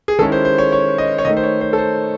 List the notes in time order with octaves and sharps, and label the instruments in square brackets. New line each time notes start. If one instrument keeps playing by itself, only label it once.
[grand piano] G#4
D#3 G#3 C#4 E4 A4
C5
C5
C#5
C#5
D#5
C#5
D#3 A3 D#4 D#5
C5
C#5
C5
A4
C5